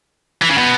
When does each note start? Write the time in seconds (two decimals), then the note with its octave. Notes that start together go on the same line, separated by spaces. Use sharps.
0.42 E3
0.50 C#3
0.58 B2